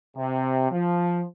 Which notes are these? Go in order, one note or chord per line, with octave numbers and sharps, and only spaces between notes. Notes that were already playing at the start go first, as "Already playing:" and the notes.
C3
F3